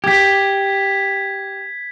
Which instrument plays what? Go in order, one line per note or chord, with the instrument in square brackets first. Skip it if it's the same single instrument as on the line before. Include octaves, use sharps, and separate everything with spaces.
[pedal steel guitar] G4 [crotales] G#6 B6